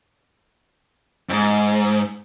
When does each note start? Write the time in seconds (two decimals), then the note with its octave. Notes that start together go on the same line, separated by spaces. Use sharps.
1.29 F2 G#2